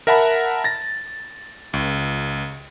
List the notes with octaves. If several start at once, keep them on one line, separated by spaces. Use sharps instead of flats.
A#4 E5 F#5 A5 B5
A6 A#6
C#2